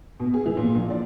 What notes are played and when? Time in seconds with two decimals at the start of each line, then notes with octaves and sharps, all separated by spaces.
0.20 B2
0.34 G#4
0.46 E3
0.57 A#2
0.75 A#1
0.90 D5